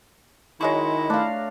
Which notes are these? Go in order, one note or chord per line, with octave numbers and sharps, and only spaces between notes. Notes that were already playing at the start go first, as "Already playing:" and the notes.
D#3 F#3 G#3 E4 C#6
A3 D4 F5